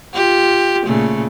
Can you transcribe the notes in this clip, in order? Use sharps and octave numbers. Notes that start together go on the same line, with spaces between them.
F4 G4
A#2 C#3 A3